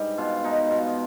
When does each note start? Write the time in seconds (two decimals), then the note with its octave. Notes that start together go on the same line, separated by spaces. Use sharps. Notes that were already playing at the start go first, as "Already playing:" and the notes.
Already playing: G#2 G3 D4 B4
0.18 B2 F4
0.44 B2 D#4
0.70 B2 F4